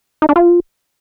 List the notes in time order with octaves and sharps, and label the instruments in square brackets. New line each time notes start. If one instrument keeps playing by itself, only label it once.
[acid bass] D#4
D4
F4